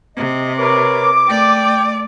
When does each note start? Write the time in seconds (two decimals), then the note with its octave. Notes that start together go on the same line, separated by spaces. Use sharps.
0.17 C3 D#5
0.59 A#4 B4 C#5 D6
1.28 A3 D5 G5